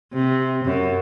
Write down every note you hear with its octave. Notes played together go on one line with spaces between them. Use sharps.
C3
F#2